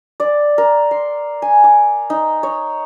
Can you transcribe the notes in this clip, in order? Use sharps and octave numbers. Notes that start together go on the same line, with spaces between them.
D5
A#4
C6
G#5
D6
D#4
C#5